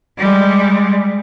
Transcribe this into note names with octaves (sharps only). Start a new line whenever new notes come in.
G3 G#3